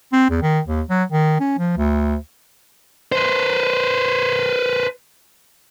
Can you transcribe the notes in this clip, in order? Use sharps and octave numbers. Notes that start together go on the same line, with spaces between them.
C4
E2
D#3
D#2
F#3
D#3
C#4
F3
D2
B4 C5